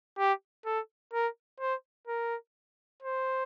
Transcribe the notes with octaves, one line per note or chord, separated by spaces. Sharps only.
G4
A4
A#4
C5
A#4
C5